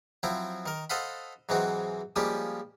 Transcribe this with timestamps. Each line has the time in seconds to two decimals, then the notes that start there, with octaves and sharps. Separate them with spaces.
0.23 F3 F#3 C4 E4
0.66 D#3 A#4
0.90 A4 C5 D#5 F5 F#5 B5
1.49 G#2 E3 F#3 G#3 C4 F#4
2.16 F3 G3 G#3 A#3 C#4 G4